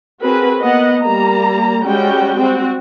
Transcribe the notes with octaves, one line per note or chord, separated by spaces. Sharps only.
C4 F#4 G#4 A#4 B4
A#3 B3 D#5 F#5
G3 A#3 A#5
G3 G#3 C#4 F#4 G5
C4 F#4